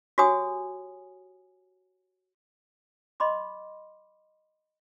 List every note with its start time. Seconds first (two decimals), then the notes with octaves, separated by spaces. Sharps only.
0.18 F#4 G4 C#5 G#5 D#6
3.20 D#5 B5 C6 D6